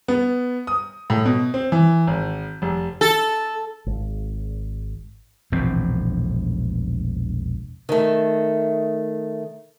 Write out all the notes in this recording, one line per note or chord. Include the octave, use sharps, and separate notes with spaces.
B3
D#6
A2
B2
C4
E3
G#1
F1
A4
G#1
E1 A#1 A2 C4
D#3 A3